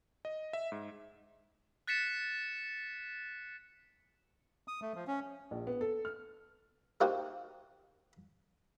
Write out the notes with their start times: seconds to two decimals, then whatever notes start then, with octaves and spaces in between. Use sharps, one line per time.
0.25 D#5
0.53 E5
0.72 G#2
1.87 F#6 A6 B6 C#7 E7
4.68 D#6
4.82 A3
4.95 F3
5.07 C#4
5.51 A#1
5.67 B3
5.81 A4
6.05 F6
7.01 A#3 D#4 F#4 G4 A#4 C5